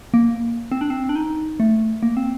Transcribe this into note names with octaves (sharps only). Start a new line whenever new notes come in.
A#3
C4
D4
C4
D4
D#4
A3
A#3
C4